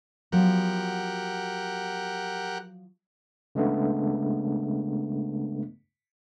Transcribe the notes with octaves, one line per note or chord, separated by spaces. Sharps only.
F3 F#3 B3 G4 A#4 F#5
C#3 G#3 A3 B3 D4